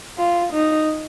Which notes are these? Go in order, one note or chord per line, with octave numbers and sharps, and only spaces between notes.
F4
D#4